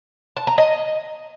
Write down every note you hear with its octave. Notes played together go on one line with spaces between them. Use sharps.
A5
A#5
D#5